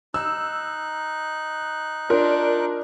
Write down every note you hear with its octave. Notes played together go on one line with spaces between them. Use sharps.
D#4 E6 F#6
D4 F4 A#4